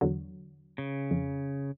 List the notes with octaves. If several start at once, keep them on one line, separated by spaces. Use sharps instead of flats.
E2 D3 F#3
C#3
F2